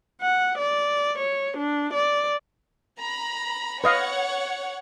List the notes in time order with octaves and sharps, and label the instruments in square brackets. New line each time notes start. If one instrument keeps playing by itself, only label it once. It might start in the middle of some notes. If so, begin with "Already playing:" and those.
[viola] F#5
D5
C#5
D4
D5
[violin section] A#5 B5
[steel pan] B4 D#5 F5 [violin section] C#5 F#5